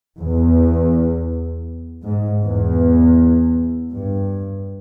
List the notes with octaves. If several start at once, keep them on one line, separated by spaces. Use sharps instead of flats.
E2
G#2
E2
G2